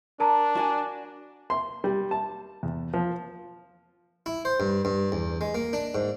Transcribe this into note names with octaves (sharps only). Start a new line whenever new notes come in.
D4 A#4 A5 A#5
F#4 D5 G#5
C6
G3
A5
E2
F3
E4
C5
G2
G2
E2
G#3
A#3
D4
G#2